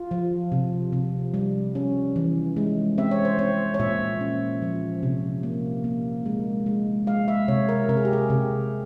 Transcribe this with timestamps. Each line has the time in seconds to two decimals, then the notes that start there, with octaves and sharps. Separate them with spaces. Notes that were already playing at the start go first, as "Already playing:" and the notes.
Already playing: F4
0.11 F3
0.52 C3
0.93 C3
1.34 G3
1.75 C#4
2.16 E3
2.56 G#3
2.98 C4 E5
3.11 C#5
3.25 C5
3.39 C4 C#5
3.74 C#5
3.80 A#2 E5
4.21 C#4
4.62 F3
5.03 C3
5.43 A#3
5.84 A#3
6.26 G#3
6.66 G#3
7.07 G#3 F5
7.28 E5
7.48 C3 C#5
7.69 A#4
7.89 C3 A#4
7.97 G#4
8.05 G4
8.13 G#4
8.30 C3